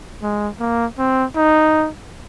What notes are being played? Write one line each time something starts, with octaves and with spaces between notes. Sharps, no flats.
G#3
A#3
C4
D#4